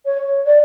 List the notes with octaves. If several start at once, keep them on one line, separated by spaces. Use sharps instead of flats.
C#5
D5